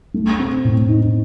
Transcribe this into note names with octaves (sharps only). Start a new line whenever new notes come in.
A3
C4
A2
D#4